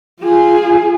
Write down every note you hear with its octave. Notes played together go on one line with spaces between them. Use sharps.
F4 G#4